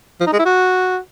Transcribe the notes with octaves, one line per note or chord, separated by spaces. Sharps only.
F3
D#4
G#3
E4
F#4